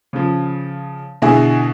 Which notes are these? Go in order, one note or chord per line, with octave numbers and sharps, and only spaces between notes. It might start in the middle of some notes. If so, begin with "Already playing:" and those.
C#3 F3
B2 D3 E4 G#4